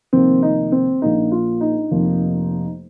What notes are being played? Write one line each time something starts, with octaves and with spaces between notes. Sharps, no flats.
F1 F2 D#3 A#3 C4
D#4
C4
A#1 A#2 A#3 D#4
F4
D#4
F1 F2 F3 A#3